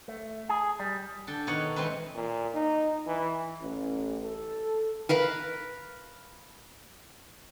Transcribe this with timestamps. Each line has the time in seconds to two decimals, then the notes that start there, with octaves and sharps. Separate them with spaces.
0.08 A3
0.49 G#4
0.80 G3
1.27 D3 A4 G5
1.47 B2 D#3 D#4 C#5 F#5
1.76 E3 G#3 C4 D#4 B4
2.15 A#2
2.55 D#4
3.07 E3
3.60 A1
4.23 A4
5.09 A#4 B4 F5 B5